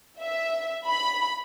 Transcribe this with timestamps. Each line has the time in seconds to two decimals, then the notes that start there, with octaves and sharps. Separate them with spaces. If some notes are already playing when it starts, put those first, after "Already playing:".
0.21 E5
0.87 B5